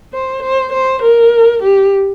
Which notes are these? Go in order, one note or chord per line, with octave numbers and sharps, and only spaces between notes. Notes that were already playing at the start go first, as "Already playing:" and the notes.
C5
C5
C5
A#4
G4